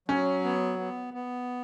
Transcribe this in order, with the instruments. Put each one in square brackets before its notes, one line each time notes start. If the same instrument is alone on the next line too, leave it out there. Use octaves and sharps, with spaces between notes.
[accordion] F#3 [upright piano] C#4
[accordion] B3
B3
B3